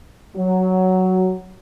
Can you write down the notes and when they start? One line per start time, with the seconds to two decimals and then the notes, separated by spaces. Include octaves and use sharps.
0.35 F#3